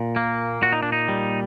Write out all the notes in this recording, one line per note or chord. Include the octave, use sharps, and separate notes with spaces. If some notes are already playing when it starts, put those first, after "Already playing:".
Already playing: A#2
A#3
A#2 F#4
D#4
D4
D#4
G3